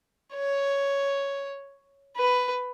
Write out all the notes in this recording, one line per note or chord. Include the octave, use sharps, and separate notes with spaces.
C#5
B4